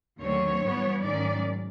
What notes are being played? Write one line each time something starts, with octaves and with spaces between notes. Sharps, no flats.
D#2 D3 F#3 A3 C4 C#5
G2 E3 G3 B3
G#2 D#3 F#3 A3 C#4 D5